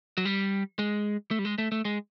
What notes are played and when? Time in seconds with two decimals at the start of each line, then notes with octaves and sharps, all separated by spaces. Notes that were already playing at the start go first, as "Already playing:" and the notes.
0.18 F#3
0.25 G3
0.79 G#3
1.31 A3
1.39 G3
1.45 G#3
1.58 A3
1.72 A3
1.85 G#3